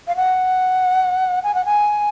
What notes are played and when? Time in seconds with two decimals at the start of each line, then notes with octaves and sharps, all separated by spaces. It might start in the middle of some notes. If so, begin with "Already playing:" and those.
0.07 F5
0.16 F#5
1.44 G#5
1.55 F#5
1.65 G#5